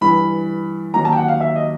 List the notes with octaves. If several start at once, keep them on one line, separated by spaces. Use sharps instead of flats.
G2 E3 B5
D#2 D#3 F#3 A#5
A5
G5
F#5
F5
E5
D#5